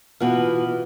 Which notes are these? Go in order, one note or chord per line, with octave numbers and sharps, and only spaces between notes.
B2 E3 F4 F#5 F#7